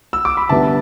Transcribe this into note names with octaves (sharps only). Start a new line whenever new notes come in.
E6
D6
B5
D3 G3 B3 E5 A5